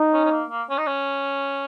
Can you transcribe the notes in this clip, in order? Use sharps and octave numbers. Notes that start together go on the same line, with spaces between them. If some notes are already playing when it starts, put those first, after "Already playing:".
Already playing: D#4
C#4
C#4
A#3
A#3
C#4
D#4
C#4